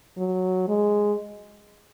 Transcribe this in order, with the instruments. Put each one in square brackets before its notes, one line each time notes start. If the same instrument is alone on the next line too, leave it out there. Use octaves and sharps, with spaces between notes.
[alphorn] F#3
G#3